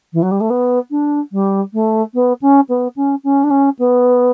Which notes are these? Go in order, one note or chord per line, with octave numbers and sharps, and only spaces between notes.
E3
F#3
G3
A3
B3
D4
G3
A3
B3
C#4
B3
C#4
C#4
D4
C#4
B3